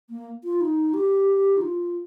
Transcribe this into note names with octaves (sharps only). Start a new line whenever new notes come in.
A#3
F4
D#4
G4
D#4
F4